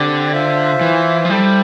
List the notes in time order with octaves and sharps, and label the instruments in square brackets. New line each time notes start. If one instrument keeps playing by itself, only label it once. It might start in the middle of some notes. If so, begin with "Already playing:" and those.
Already playing: [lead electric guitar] D3 [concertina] C4 G4 D5 G5
[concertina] F4 C5 E5
[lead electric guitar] E3
F3
[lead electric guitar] G3 [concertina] E4 A4 C5 G5